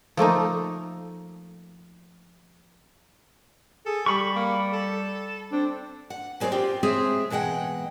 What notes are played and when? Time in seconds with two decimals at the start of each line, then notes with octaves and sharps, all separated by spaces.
0.17 F3 A3 A#3 D#4
3.86 G#4 A4
4.06 G3 G4 B5 C#6
4.36 A#3
4.73 A4
5.52 C4 D4
6.10 F#5
6.40 F#3 G#3 C4 C5 D5
6.52 C4 F4 G4
6.83 G#3 A3 C4 G#4 C#5 E5
7.30 B2 E3 G#3 F#5 G5